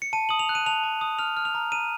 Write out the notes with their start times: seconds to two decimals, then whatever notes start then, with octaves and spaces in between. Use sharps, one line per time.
0.02 C#7
0.13 A5 D#7
0.29 D#6 F#7
0.39 F7
0.49 F#6
0.55 D#7
0.66 A5 F7
0.83 A5
1.01 D#6
1.19 F6 F7
1.37 F6
1.45 F7
1.55 A#5
1.72 A#5 D#7